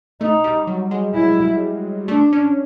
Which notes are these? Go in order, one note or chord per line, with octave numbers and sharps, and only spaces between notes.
A3 D#4
G3
F#3
G#3
E4
A3 D4
C#4